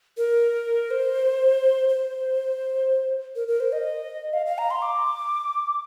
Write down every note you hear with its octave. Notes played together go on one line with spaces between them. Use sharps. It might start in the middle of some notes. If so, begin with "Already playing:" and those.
A#4
C5
C5
A#4
A#4
C5
D#5
F5
F5
A#5
C6
D6